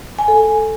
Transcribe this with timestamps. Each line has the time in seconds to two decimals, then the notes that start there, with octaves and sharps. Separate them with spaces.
0.19 G#5
0.28 A4
0.38 G#5